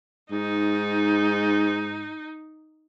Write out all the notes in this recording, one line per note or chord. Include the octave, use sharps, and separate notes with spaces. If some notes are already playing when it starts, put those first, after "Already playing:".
G#2 D#4